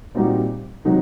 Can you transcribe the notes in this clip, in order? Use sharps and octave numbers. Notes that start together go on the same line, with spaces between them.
A#2 G3 C4 D#4 F#4
C3 D#3 F#3 C4 D#4